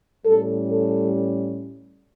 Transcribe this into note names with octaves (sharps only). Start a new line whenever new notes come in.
A2 G3 C#4 A4
A4